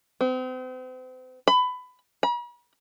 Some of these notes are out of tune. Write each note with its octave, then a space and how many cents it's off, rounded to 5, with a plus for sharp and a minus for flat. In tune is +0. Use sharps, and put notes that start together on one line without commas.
C4 -40
B5 +20
B5 -45